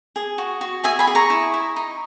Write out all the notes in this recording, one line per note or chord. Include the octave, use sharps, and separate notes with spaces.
G#4
F#4
F#4
G#4 E5 G#5
G#5 B5
G#4
A#5 C#6
E4
E4
D#4